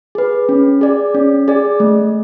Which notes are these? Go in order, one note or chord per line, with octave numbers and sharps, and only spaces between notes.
G#4 B4
C#4
G#4 D5
C#4
G#4 D5
A3